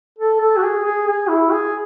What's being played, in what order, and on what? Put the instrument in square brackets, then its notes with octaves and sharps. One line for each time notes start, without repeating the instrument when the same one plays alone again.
[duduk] A4
A4
F#4
G#4
G#4
G#4
E4
G#4